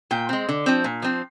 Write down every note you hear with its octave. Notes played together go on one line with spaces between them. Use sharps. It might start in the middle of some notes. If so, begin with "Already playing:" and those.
A#2 G5
G#3 C4
D3
F3 C4
A#2
F3 C4